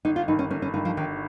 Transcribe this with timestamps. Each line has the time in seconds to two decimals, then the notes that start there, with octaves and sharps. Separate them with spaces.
0.05 G1 D#4
0.16 F4
0.28 G2 D#3 D#4
0.39 C#4
0.51 G1 C#4
0.62 C#4
0.74 G2 D#3 D#4
0.85 F3
0.97 G1 D#3